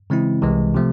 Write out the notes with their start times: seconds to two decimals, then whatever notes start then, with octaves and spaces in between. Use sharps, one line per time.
0.10 C#3 E3 G#3 C4 E4
0.42 C2 C3 E3 G#3
0.75 C3 F3 A3